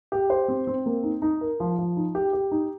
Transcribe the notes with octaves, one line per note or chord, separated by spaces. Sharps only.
G4
C5
C4
C4
A#3
D#4
D#4
A#4
F3
F3
D#4
G4
G4
D#4